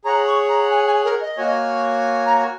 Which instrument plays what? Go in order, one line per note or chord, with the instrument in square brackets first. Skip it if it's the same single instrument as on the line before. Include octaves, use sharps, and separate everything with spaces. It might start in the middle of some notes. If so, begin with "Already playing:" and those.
[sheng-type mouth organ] G#4 C#5 F#5 [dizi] A#5
[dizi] C#6
A#5
G#5
G#5
A#4
D#5
[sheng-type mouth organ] A#3 F#4 C#5 G#5
[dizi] A#5